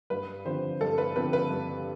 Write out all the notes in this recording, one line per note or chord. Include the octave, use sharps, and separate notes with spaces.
G2 B4
D3 F3 C4 G4 C5
G2 A4
B4
D3 F3 C4 G4 B4
B4
G2